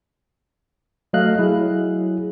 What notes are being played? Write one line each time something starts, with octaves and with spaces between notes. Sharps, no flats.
F#3 A3 D#5 F5 F#6
F#3 E4 G#4